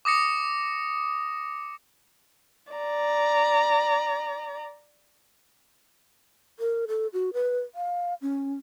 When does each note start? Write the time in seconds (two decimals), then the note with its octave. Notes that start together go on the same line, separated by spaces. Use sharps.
0.05 D6 D#6 A#6 C#7
2.73 D5 A#5
6.59 A#4
6.88 A4
7.13 F#4
7.34 B4
7.75 F5
8.22 C#4